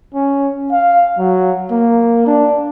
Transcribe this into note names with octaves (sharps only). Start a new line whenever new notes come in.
C#4
F5
F#3
A#3
D4